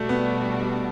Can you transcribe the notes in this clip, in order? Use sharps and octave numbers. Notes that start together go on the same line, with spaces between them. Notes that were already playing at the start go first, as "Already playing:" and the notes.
Already playing: B2 G3 A3 D4 F#4
B3